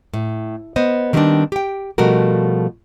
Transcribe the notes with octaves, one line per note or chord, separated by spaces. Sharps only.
A2
B3 C5 D#5
D#3 F#3 G3 B3 C4 D4
G4 G5
B2 F3 G3 A3 F#4 A#4